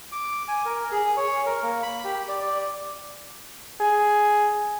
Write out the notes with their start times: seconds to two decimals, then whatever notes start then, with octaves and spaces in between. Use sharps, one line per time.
0.12 D6
0.48 G#5
0.65 A#4
0.91 G#4
1.17 C#5
1.46 A#4
1.63 A#3
1.83 B5
2.04 G4
2.28 D5
2.41 D5
3.80 G#4